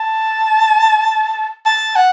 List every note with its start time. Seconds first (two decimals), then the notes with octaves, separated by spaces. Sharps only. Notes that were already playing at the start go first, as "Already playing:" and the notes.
Already playing: A5
1.66 A5
1.96 F#5